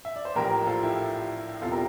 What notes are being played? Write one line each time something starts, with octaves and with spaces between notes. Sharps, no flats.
E5
D5
C5
A#1 A2 F3 G4 A#4
F4 A4
E4 G4
E1 E2 C3 F4 A4
G4 A#4